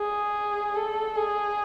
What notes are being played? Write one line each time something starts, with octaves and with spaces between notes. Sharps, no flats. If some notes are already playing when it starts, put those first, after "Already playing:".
Already playing: G#4
A4
G#4